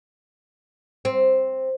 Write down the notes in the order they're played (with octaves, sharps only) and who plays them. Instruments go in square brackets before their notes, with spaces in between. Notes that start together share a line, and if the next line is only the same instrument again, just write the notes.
[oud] C4